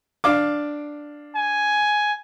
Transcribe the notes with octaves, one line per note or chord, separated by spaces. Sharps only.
D4 F5 D6
G#5